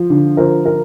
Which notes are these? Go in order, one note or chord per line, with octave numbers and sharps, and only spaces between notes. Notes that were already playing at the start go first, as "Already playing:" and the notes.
Already playing: F3
D3
F3 A#4 C5
A#4